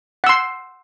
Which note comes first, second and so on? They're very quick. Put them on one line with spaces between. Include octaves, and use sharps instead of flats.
F#5 E6 C6